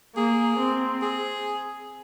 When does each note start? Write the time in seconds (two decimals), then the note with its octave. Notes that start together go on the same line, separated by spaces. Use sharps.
0.16 A#3 G#4
0.59 C4
1.02 G#4